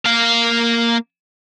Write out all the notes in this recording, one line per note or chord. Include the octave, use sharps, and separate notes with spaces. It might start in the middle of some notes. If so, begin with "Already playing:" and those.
A#3 F5